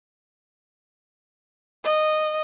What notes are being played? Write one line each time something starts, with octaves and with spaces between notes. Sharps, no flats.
D#5